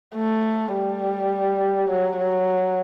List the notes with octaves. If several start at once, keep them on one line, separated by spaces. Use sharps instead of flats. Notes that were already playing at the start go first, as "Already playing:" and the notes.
A3
G3
F#3
F#3